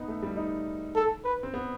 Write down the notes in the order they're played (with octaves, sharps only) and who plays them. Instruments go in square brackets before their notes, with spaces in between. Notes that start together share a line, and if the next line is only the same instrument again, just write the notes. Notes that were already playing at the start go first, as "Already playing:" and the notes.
Already playing: [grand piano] B3 D#4
A3
G3
D#4
[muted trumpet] A4
B4
[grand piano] C4
B3